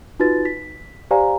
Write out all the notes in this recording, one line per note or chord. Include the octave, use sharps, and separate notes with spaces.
D#4 F4 F#4 B4 A6
B6
G4 C5 D5 F5 G#5 A#5